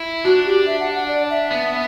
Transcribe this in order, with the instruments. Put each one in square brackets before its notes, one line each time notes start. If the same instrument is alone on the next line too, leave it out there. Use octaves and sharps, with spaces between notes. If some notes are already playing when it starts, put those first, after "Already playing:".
Already playing: [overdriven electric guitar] E4
[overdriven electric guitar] D4 [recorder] F#4
[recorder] G4
E5
F#5
F#5
D5
E5
[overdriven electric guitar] B3